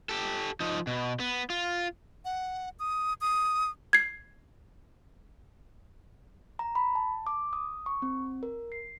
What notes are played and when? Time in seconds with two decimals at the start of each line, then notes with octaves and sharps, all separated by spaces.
0.09 G4 A4
0.60 F3 D#4
0.87 B2
1.20 B3
1.50 F4
2.25 F#5
2.79 D#6
3.21 D#6
3.93 G#6 C7
6.59 A#5
6.75 B5
6.95 A5
7.27 D6
7.53 D#6
7.86 C#6
8.02 C4
8.43 A#4
8.72 C7